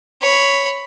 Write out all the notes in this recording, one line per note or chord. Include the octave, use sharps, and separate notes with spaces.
C#5 B5